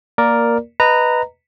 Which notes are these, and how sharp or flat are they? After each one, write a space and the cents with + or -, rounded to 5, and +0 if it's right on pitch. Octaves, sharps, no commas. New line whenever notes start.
A#3 +0 A#4 +5 D5 +0
B4 +0 D#5 +0 A#5 -15